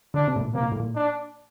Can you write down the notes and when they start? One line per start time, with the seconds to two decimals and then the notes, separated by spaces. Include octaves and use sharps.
0.14 D3 D4
0.28 C3
0.36 A2
0.41 A#2
0.54 C3 A#3
0.63 A#2
0.72 A2
0.80 A#2
0.95 D4